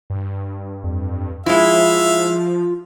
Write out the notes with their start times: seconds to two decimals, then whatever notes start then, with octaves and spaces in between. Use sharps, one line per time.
0.10 G2
0.84 F2
1.46 F3 G#3 E4 F4 E5 F5